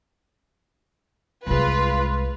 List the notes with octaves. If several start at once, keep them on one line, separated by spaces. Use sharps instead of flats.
C2 G#3 F4 B4